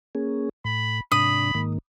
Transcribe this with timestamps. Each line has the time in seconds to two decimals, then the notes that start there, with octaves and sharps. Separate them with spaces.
0.15 A#3 C#4 G#4
0.65 A2 B5
1.12 G#2 C3 D4 B5 D#6
1.55 G#2 D#3 A#3